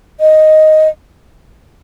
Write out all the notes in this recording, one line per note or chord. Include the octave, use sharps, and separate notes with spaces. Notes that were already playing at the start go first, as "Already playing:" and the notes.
D#5